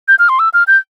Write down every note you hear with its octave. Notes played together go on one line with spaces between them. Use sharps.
G6
F6
C6
E6
F6
G6